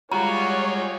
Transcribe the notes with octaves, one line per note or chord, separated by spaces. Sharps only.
G3 G#3 F4 F#4 C#5 A#5